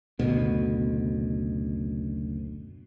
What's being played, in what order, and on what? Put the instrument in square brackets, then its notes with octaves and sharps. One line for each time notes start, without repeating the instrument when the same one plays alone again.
[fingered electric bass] F#1 D2 [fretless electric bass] B2